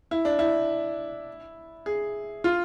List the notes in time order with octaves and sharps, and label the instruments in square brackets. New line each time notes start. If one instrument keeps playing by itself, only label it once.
[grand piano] E4
D4
E4
G#4
F4